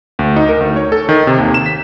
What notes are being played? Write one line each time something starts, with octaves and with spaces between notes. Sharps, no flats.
D2
D#4
A#4
D2
C#5
A4
D#3
C3
D#2
E7
B6